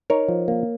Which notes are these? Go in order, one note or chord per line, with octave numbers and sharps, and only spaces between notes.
D#4 A#4 C#5
F3
A#3